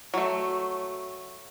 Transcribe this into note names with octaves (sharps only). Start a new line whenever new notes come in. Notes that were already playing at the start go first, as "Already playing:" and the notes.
F#3 A3